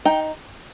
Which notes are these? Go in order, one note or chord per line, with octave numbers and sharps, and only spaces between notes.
D#4 G5